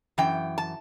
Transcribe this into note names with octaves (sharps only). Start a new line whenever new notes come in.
F#2 E3 G5
A5